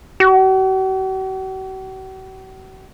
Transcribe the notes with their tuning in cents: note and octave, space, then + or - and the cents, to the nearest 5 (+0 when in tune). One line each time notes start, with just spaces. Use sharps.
F#4 +45